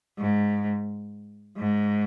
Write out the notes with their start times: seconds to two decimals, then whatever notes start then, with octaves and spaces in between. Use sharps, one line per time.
0.19 G#2
1.58 G#2